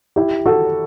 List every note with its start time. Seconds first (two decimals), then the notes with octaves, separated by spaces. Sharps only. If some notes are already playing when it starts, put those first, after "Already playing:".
0.16 E4 G4
0.46 F#4 A4